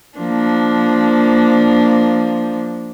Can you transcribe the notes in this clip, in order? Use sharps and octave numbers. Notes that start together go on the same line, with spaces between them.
F3 A#3 D4